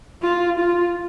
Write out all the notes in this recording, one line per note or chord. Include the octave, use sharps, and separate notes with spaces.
F4
F4